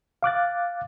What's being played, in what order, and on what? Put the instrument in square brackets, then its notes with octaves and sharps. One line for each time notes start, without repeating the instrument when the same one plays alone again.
[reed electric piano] F5 D6 F#6 A6